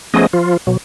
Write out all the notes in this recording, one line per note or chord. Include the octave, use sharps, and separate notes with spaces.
F3 A3 B3 C#4 G#4 D#5
F3 F4
B2 F#3